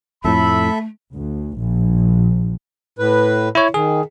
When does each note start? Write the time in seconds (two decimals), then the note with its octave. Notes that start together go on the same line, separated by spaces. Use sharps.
0.24 F2 A2 A3 A4 E5 B5
1.14 D2
1.58 A#1
2.99 A2 B4
3.55 E4 C#5
3.74 D#3 G#4